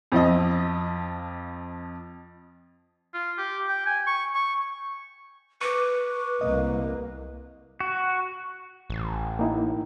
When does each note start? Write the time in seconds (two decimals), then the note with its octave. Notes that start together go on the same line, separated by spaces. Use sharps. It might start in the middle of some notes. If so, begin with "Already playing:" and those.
0.12 F2 F3 D#5
3.14 F4
3.38 G4
3.67 G5
3.86 G#5
4.07 C#6
4.35 C#6
5.61 B4 C#6 D6
6.41 C2 A#3 D#5
7.80 F#4
8.90 A1
9.39 A#3 D#4 E4